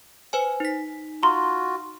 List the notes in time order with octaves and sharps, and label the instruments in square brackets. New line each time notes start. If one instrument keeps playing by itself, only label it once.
[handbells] B4 C5 G#5
D#4 B6
[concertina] F4 F#4 [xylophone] A#5 C6